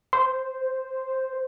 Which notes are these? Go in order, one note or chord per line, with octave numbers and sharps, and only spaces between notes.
C5